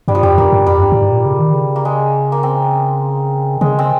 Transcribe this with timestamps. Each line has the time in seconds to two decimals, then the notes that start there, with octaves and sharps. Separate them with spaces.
0.08 G2 G3
0.15 F3
0.23 F2 G3
0.38 G2 A#3
0.52 G2
0.67 F2 G3
0.82 G2
0.92 A#2
0.97 G#2
1.12 A#2
1.26 C#3
1.39 D#3
1.53 C#3
1.76 A#3
1.85 G#3
2.32 A#3
2.43 C4
3.61 C#3 G#3
3.79 C4